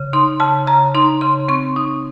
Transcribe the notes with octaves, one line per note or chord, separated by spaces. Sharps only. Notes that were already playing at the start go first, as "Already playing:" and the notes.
Already playing: C#3
D#4 C6
C#3 A5
C#3 A#5
D#4 C6
C#3 C6
C4 C#6
D#4 D#6